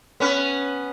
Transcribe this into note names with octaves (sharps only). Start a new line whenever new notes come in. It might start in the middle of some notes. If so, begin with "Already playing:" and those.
B3 C#4 B4